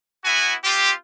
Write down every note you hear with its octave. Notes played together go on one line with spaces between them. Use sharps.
B3 E4 F#4 G#5
C4 F4 G4